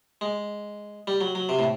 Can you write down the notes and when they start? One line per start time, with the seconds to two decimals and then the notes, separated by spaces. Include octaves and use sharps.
0.21 G#3
1.07 G3
1.21 F#3
1.35 F#3
1.49 C3
1.59 A2